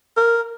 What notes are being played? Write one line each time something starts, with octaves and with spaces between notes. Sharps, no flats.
A#4